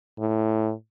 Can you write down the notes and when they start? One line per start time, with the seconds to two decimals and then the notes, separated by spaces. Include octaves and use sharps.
0.19 A2